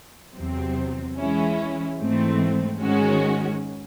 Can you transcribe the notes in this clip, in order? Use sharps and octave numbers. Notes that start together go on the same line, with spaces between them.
E2 C3 F#3 C4
E3 G#3 C#4 E4
G#2 E3 A3 C4
G#2 D#3 G#3 C#4 F#4